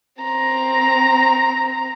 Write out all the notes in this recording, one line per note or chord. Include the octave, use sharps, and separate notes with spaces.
C4 A#5